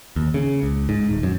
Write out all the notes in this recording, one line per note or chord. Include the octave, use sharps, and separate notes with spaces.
D#2
C#3
C#2
G#2
D#1
F#2